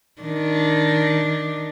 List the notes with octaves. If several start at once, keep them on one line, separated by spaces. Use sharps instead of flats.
D#3 D4